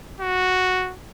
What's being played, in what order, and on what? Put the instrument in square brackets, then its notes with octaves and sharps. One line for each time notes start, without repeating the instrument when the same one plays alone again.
[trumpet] F#4